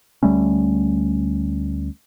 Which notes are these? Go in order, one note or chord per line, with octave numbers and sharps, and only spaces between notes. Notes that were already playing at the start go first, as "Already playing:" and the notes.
D2 G3 A3 C#4